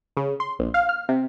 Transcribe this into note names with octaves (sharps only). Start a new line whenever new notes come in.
C#3
C6
A#1
F5
F6
C3